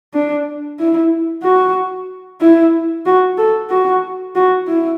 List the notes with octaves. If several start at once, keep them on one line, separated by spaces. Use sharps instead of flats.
D4
E4
F#4
E4
F#4
A4
F#4
F#4
E4